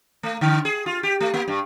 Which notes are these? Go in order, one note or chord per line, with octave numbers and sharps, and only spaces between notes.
A3
D3
G#4
F4
G4
A3
A#3
G2